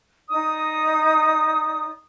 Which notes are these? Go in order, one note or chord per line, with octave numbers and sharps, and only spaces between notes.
D#4 D5 D#6